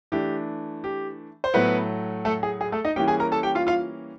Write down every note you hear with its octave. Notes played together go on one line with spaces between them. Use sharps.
E3 A3 D4 G4
G4
C5
A2 F#3 A3 B3 B4
A3 A4
G#4
G#4
A3 A4
D#4 D#5
E3 G3 A#3 C#4 G4 G5
G#4 G#5
A#4 A#5
A4 A5
G4 G5
F4 F5
F4 F5